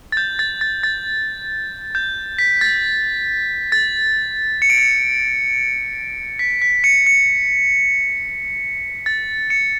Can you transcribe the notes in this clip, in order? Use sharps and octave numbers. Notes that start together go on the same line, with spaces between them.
A6
G6
A6
A6
A6
G6
B6
A6
A6
C#7
D7
C#7
B6
B6
C#7
C#7
A6
C#7